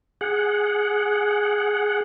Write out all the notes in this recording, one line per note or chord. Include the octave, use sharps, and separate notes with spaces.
G#4 F#5